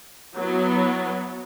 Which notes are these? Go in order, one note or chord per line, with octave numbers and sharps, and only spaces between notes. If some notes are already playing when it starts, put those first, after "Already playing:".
F#3 B3 E4